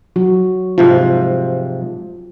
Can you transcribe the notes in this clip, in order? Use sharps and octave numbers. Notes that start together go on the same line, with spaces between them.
F#3 F#4
G#2 C3 F3 F4